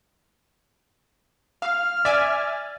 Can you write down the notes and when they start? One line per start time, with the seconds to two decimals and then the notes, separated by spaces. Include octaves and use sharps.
1.62 F5 F6
2.05 D5 E5 G#5